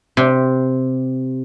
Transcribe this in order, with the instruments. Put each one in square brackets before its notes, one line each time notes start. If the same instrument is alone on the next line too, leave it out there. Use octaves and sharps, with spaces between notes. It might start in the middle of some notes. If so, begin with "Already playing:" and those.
[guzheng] C3